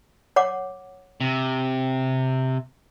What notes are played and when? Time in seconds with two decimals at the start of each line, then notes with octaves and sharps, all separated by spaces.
0.36 C#5 F#5 D6
1.21 C3